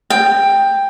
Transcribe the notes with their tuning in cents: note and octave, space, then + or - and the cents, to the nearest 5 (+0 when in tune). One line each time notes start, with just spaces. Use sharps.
G5 +10